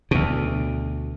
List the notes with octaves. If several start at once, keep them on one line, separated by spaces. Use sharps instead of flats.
D2 B2